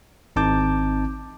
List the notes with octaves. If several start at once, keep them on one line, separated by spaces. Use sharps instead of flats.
G#1 C4 D#4 A5 D6 G6